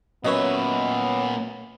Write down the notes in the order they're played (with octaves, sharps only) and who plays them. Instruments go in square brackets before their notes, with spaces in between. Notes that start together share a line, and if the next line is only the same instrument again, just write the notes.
[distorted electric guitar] A#2 E5 [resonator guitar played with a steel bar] F#3 C#4 B4 [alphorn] B3 [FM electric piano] C#5 D#5